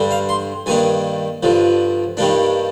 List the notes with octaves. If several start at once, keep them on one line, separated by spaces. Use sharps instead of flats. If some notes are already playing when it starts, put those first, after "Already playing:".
Already playing: G2 D3 G3
F5
C6
G2 D#3 A#3 D4 G#5
G2 D3 F3
G2 D#3 G3 A#3 D4